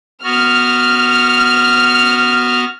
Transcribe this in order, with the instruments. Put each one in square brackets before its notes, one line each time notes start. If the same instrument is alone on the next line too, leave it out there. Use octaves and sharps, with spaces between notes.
[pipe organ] B3 F#4 [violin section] F6